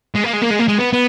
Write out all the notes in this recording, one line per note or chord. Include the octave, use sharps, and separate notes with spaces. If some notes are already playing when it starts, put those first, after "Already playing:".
G#3
A#3
G#3
A#3
G#3
A#3
G#3
B3
B3